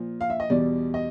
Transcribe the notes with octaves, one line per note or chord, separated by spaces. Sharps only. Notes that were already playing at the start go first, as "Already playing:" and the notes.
Already playing: A#2 F3
F5
E5
D#5
E2 B2 G3 D5
D#5